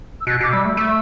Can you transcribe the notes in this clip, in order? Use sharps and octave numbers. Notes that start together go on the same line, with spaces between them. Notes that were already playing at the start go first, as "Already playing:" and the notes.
E6
B2 F#6
B2 D6
G3 E6
A3
A3 E6